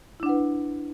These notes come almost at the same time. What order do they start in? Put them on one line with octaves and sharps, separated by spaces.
E4 D4 F#5 B4